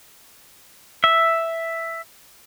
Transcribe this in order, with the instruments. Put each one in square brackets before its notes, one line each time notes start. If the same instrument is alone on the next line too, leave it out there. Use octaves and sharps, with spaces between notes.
[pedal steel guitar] E5